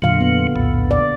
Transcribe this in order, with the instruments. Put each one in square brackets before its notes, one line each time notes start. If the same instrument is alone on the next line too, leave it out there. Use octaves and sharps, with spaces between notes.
[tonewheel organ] F2 F#3 [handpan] A#2 D3 F5
[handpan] B3
[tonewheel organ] B1 E2 A2
[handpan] D5